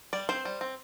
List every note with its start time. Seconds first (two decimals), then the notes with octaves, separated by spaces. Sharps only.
0.13 G3 D5
0.29 C4 C5
0.45 G3
0.61 C4